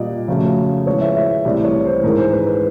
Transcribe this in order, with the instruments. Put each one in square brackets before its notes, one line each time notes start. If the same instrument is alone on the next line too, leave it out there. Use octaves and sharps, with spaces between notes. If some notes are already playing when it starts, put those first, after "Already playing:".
Already playing: [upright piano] A#2 G3 A#3 D5 D#5
F2 C#3 F#3 A3
A2 F3 G#3 B3 C#5
E5
E5
E5
C2 C3 E3 A3 D5
C#5
C5
G#2 E3 G#3 A#4
C5
B4
B4